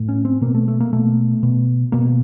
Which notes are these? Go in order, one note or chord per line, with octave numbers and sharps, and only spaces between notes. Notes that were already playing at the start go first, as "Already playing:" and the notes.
Already playing: A2
C#4
C4
B2 A#3
A3
A3
A#3
B2 A3
B2
B2 A#3